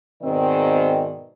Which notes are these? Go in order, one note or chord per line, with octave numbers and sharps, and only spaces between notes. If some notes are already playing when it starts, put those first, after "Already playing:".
G#2 B2 D#3 C4 D5 D#5